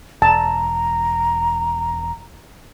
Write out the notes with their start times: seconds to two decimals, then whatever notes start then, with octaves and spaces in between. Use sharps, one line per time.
0.22 E1 A5 A#5